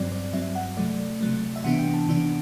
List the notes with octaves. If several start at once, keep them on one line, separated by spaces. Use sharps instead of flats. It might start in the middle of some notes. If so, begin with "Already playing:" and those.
Already playing: G2 F#3 C4 D5
D5
G2 F#3 C4 E5
F#5
C3 F#3 A3 D5
C3 F#3 A3
E5
C3 E3 B3 D4 F#5
G5
A5
C3 E3 B3 D4